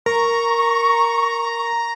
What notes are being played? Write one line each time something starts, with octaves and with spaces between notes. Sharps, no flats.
A#4 A#5 C#6